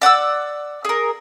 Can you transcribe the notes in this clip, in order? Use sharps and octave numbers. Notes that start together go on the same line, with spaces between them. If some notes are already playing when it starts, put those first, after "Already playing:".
D5 F#5 D6 E6
G#4 A#4